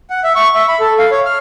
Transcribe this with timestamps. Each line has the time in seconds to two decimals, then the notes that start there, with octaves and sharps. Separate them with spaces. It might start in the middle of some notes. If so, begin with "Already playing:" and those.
0.10 F#5
0.24 E5
0.35 C#6
0.55 E5
0.68 B5
0.80 A4
0.99 F5
1.11 C#5
1.25 F6